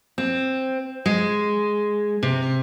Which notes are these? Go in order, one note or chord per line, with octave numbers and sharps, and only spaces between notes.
C4
G#3
C3